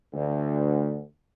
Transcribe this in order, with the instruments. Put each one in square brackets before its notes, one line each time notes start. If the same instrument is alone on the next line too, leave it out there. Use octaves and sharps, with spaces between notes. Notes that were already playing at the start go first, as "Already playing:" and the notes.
[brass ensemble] D2